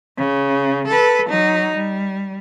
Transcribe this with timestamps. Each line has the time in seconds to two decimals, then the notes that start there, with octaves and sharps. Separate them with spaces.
0.18 C#3
0.87 A4 B4
1.30 F#3 D#4
1.76 G3